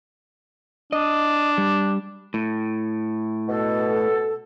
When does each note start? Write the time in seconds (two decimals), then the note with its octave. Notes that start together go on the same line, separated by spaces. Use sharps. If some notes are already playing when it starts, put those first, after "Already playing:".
0.93 D4 D#5
1.58 G3
2.34 A2
3.49 B2 A4